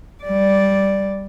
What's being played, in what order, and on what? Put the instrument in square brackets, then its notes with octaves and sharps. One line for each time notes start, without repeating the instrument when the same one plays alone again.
[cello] G3 D5